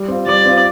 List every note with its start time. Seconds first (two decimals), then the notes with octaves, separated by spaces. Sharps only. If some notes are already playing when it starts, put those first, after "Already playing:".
Already playing: G3
0.08 C4 F4
0.27 G3 D5
0.45 C4 F4